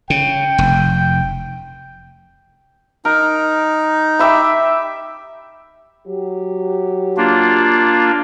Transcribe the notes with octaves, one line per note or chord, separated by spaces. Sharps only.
C#3 G5
F1
D#4 A#4
G4 E5 B5
F#3 G4
A#3 D4 F4